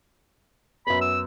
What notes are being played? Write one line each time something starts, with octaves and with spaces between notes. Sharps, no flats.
F#2 B3 B5
E6